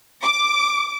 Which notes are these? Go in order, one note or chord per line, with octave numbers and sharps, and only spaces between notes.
D6